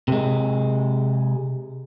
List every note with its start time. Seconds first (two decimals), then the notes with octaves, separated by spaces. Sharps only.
0.08 C3 G#3